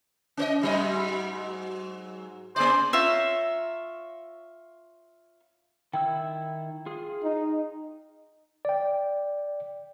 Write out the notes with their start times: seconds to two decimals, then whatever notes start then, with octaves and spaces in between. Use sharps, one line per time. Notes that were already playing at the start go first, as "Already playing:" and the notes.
0.37 C#4 C5 D#5
0.61 G#2 F#3 D#5
2.56 A#3 G#4 C5 D5
2.93 F4 C#5 E5 A#5
5.93 D#3 E4 G5 E6
6.86 F4 G#4
7.23 D#4
8.65 D5 G5